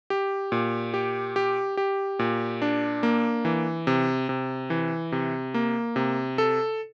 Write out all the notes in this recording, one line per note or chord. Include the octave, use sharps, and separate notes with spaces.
G4
A#2
G4
G4
G4
A#2
D4
A#3
E3
C3
C3
E3
C3
A#3
C3
A4